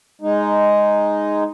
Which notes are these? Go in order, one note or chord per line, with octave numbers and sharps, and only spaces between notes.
G#3 D#4